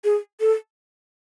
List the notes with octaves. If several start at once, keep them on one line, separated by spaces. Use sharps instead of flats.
G#4
A4